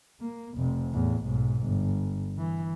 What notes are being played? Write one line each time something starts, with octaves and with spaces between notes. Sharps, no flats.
A#3
F1 C3
E2 A2
B1 G#2
G1
E3